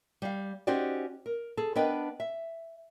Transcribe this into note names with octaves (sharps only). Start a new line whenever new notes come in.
G3 F5
C#4 D#4 F#4 G4 C5 D5
A#4
G#4 A4
B3 D4 A#4 B4 D#5 G5
E5